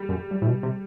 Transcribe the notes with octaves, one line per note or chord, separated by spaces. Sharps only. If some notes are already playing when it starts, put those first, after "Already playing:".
Already playing: G3
F#2
G2
A2
B2
C3